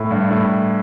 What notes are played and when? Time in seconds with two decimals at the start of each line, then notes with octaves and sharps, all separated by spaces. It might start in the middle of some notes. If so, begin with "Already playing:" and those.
Already playing: A2
0.11 G2
0.31 A2